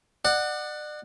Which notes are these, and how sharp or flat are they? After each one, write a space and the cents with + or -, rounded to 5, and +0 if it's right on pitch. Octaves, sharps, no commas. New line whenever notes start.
D5 +35 F#5 +0